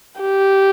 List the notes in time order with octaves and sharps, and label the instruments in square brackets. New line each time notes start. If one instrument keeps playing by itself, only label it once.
[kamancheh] G4